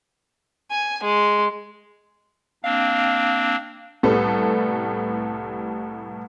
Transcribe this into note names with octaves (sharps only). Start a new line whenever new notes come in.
G#5
G#3
A#3 C4 D4 F5
C2 A2 G3 B3 A4